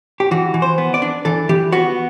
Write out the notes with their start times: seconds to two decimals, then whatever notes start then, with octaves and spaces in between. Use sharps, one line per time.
0.20 G4
0.31 E3 F#4
0.54 E3
0.62 C5
0.78 B3
0.94 D5
1.02 D4
1.25 E3 A4
1.49 E3 G4
1.72 B3 F#4